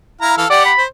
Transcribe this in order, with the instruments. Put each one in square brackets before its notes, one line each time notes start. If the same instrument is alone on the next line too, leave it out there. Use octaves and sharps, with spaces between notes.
[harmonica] E4 F5 A#5
E3 A4 F5
[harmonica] G4 F#5 [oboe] D5
[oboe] B5
[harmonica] C5